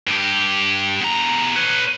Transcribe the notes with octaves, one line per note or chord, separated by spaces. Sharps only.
G2 G4
E2 A#5
B4 C#5